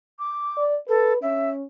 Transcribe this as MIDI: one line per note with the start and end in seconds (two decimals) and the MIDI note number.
0.19 0.62 86
0.57 0.77 74
0.88 1.13 69
0.88 1.21 71
1.22 1.64 61
1.22 1.49 76